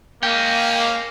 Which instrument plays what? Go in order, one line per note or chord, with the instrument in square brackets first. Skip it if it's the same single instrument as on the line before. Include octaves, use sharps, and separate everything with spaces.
[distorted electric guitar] G#3 C#4 [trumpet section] A#3 [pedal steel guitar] G5